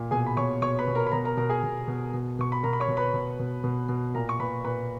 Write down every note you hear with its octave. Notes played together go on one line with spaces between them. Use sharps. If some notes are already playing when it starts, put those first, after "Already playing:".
Already playing: A#2
B2 G#4 G#5
B5
B2 C#5 C#6
B2 C#5 C#6
B4 B5
B2
A#4 A#5
B5
B2 A#4 A#5
A#4 A#5
B2 A#4 A#5
G#4 G#5
B2
B2
B2
B2 C#6
B5
B2 A#4 A#5
B5
C#5 C#6
B2
B4 B5
B2
B2
B2
B2
A#2 A#4 A#5
C#6
A#2 B4 B5
A#2 B4 B5